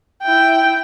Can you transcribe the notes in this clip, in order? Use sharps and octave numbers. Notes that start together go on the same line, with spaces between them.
E4 G5